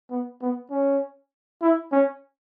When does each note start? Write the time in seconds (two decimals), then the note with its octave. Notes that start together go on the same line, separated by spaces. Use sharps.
0.11 B3
0.42 B3
0.71 C#4
1.62 E4
1.92 C#4